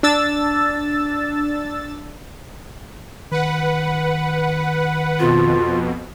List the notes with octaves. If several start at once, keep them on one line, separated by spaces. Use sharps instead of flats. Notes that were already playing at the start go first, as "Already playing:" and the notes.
D4 E6 A6
D#3 B4 F#5
F2 B2 F4